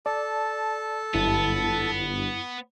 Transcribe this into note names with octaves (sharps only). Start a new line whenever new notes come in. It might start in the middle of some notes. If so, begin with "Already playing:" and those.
A4 D5 A5
G1 F#2 B3 E4